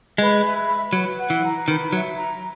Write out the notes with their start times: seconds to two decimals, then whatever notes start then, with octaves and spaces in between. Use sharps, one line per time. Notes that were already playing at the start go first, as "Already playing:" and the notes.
0.18 G#3 B4
0.43 E5
0.68 B5
0.93 F#3 B4
1.17 F#5
1.30 E3
1.42 A#5
1.68 D#3 B4
1.92 F#3 E5
2.17 A#5